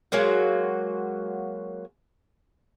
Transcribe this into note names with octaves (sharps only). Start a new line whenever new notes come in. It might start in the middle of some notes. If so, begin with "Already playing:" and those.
F#3 G#3 A#3 F#4